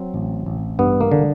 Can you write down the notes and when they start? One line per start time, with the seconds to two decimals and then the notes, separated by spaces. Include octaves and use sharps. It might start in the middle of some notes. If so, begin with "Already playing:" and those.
Already playing: F#3 C4
0.14 A1
0.46 A1
0.79 G2 B3
1.01 A#3
1.12 D3